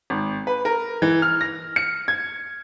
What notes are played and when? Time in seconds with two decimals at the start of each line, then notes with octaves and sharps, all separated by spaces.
0.10 G#1
0.47 B4
0.65 A#4
1.02 E3
1.22 F6
1.41 A#6
1.76 C#7
2.08 G#6